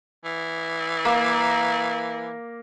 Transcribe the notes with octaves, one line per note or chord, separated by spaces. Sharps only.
E3
A#3